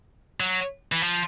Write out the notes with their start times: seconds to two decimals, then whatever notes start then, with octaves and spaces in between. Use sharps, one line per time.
0.40 F#3
0.92 E3
1.02 F3